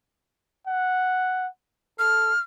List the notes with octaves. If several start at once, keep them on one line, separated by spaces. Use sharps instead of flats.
F#5
A4 F6